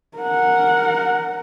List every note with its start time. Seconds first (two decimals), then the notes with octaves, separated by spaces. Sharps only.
0.18 A#4 F#5